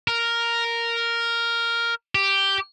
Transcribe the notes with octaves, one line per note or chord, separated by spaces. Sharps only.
A#4
G4